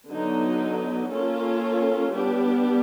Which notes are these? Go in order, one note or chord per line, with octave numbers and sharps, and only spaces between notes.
D3 F#3 B3 D#4
A#3 C#4 F4 A4 C#5
G3 B3 D4 G4